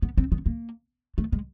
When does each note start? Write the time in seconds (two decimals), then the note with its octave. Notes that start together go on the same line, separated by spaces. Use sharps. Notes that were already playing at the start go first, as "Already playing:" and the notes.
0.02 B3
0.17 C4
0.32 B3
0.46 A#3
1.18 A3
1.32 G#3